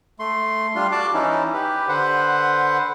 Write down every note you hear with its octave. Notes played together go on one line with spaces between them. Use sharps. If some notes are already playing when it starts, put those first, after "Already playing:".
A3 C6
G3 D4 F4 C6
F#4 D5 A5 D6
E3 C#4 D#4 E4
G4 B4
D3 B4 C5 F#5